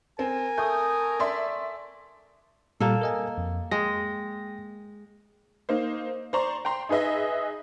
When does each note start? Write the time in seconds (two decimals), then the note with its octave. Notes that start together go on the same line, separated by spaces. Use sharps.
0.19 C4 A#4 G#5
0.58 A3 D#6 G6
1.20 D5 E5 C6
2.80 A#2 G3 A#3 A4
3.02 A#4 D#5 G#5
3.38 F2
3.71 G#3 G5 A#6
5.69 A#3 D#4 C5
6.33 C5 D5 A#5 C6 C#6
6.65 G5 A#5 C6
6.89 D#4 G#4 B4 D#5 E5